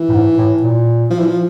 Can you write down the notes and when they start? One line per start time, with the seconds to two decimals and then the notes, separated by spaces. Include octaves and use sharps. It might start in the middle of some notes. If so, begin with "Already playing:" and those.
Already playing: E3
0.09 A2
0.13 G#2
0.38 A2
0.62 A#2
1.10 F3
1.19 E3
1.27 F3